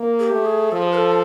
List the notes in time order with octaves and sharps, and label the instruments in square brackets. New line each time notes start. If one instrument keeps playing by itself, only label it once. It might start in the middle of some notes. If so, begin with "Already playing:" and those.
Already playing: [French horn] A#3
[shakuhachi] G#4
G4
[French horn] A3
[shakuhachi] G#4
[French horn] F3 [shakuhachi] A4
[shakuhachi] G#4
B4
A4